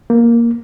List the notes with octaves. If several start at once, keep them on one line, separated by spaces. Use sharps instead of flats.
A#3